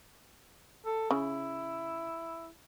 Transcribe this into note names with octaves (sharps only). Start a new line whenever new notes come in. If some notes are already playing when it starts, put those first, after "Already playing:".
A4
C#3 E4